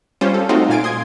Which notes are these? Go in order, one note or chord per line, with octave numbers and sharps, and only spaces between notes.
G3 C#4 F4 C5
A4
A3 C4 D#4 F4 F#4
A#2 F5 G#5 A6 D7
C6 D#6 G#6